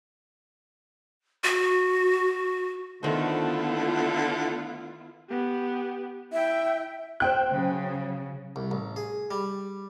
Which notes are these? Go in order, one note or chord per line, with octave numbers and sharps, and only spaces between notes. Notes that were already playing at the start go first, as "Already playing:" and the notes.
F#4
D3 D#3 A3 B3 E4 F4 C5
B3 G4
E4 E5 G5
C5 G5 F#6
C#3 F#3
C2
A1
G#4
G3